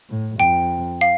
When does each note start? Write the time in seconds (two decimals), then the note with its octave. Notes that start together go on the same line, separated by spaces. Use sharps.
0.09 A2
0.39 F2 G5
1.01 F5